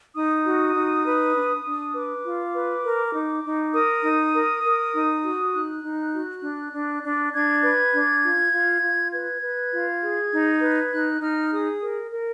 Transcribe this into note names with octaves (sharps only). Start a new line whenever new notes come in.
D#4 D#6
F#4
D#4
B4
D4
D4
B4 D6
F4
B4
A#4
D#4
D#4
A#4 D#6
D#4
A#4
A#4
D#4
F#4
D#4 F#6
D#4
F#4
D4
D4
D4
D4 G#6
B4
D4
F4
F4
F4
B4 G#6
B4
F4
G#4
D#4
B4
D#4 F#6
D#4 F6
G#4 D#6
A#4
A#4